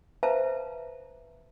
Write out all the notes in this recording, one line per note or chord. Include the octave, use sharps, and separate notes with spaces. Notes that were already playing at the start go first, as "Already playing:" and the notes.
B4 C5 E5 F5 A5 A#5